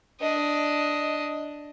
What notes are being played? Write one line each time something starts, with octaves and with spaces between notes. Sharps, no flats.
D4 D#5